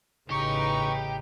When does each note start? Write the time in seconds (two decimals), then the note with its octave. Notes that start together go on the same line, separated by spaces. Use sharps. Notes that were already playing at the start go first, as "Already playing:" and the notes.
0.30 A1 C#3 D#4 G4 B4 C#6